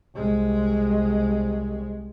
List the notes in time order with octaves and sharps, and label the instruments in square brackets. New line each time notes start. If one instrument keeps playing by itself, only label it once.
[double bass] C2 G#3